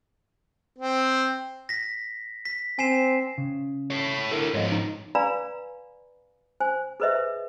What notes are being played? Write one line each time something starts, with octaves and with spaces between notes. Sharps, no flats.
C4
A#6 B6
B6
C4 G#5 C7 E7
C#3
A4 C#5
D3 E4 A4 A#4
G#2 F3 C#5 D#5
D#4
B4 D5 F5 G#5 A#5 B5
C5 G#5
G#4 A4 B4 C5 D#5 E5